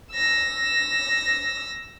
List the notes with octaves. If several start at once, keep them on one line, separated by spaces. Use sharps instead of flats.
E6 A#6